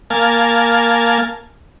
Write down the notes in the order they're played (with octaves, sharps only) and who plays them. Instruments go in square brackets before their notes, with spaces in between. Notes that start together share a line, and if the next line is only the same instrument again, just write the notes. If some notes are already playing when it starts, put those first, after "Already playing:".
[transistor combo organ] A#3 F5 G#5 A5